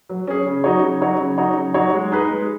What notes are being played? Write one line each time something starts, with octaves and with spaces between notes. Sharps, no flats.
F#3
C#4 G#4
C#3
F#3 D#4 F#4 C#5
C#3
F#3 D#4 F#4 C#5
C#3
F#3 D#4 F#4 C#5
C#3
F#3 D#4 F#4 C#5
G#3
D#4 G#4 B4
G#3